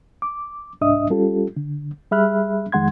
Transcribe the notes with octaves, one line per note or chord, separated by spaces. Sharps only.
D6
C2 G#2 D4 D#5 E5 D#6
G3 C#4 F4 G4 A4
D3
G3 G#4 E5 B5 F6 F#6
F2 D#3 G#3 F#5 C6 G#6